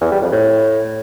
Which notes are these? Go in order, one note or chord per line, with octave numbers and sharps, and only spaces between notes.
E2
G3
F2
A2